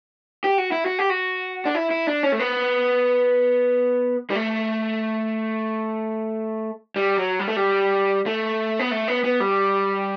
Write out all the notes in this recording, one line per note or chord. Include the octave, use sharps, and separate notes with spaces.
G4
F#4
E4
F#4
G4
F#4
D4
E4
E4
D4
C#4
A3
B3
G3
A3
G3
F#3
G3
A3
G3
A3
B3
A3
B3
B3
G3